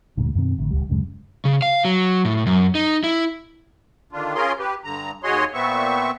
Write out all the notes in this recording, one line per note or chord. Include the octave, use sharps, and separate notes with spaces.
D2 G2 A#2
F#2 B2 D#3 C4
A1 D3
D1 G#1 C#2 G3
D1 F#2 C#3 G#3
C#3
F5
F#3
A2
F#2
D#4
E4
D3 D#3 D4 F4
C#4 F4 G#4 A#4 C6
G4 B4
G2 D3 A#5
D#2 F#4 G#4 C#5 D#5 C6
A#2 B3 C4 E5 C#6